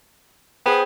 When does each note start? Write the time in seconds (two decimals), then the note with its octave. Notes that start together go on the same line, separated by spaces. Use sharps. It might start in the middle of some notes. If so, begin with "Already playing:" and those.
0.66 B3 G#4 C5 G5